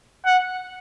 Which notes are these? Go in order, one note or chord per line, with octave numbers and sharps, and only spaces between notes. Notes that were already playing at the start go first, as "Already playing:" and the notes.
F#5